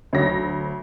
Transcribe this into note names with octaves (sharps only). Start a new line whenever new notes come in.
D2 F#3 A#6